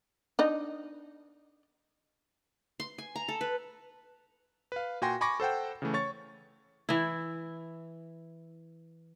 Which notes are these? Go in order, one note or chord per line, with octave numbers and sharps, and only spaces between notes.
D4 D#4 D#5
C6
G#5
A#5
A4
B4
B4 F5
A#2 F#4 G5 G#5 C6 A#6
G#5 B5 C#6 D6 A#6
A4 C5 F#5 G5
C#3 E3 A3
C#5 C#6 A6
E3 E4